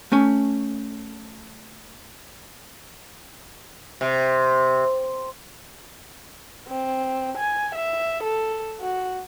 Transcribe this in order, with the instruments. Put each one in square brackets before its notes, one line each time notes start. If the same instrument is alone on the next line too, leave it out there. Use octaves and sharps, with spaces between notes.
[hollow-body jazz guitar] A3 C#4 G#5
[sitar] C3
[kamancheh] C4
G#5
E5
A4
F#4